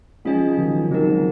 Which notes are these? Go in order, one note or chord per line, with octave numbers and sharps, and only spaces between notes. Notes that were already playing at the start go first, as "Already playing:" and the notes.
F3 G#3 C#4 F4 G#4 D#5 G#5
F3
D#3 F#3
D#3 F#3 C4 D#4 A#4
F3 G#3